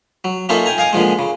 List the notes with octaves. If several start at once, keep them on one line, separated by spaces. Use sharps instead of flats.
F#3
A#3 C#4 D#4 F4 A4 E5
G5 G#5 A#5
D#5 F5 G#5 D6 D#6
A#2 D3 F3 G#3
C#3